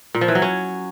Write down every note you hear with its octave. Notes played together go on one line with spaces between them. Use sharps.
A#2
F3
E3
F#3
C#4